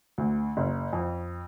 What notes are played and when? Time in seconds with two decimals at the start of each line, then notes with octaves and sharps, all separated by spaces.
0.18 D2
0.57 F#1
0.93 F2